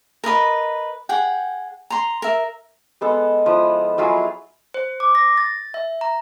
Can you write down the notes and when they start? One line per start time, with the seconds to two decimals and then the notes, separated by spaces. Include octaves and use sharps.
0.24 A#4 B4 D#5 B5
1.09 G#4 F#5 G5
1.90 A#5 C6
2.22 A#4 E5
3.01 G#3 B3 A4
3.46 F3 E4 D#6
3.98 F#3 E4 F4 G#4
4.74 C5
5.00 D6
5.15 A#6
5.37 A6
5.74 E5
6.01 A#5